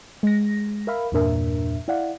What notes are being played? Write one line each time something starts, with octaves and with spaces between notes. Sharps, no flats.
G#3 A#6
A#4 E5 F5 B5
E2 G2 A#2 D4 A#4 E5
E4 D5 F5 F#5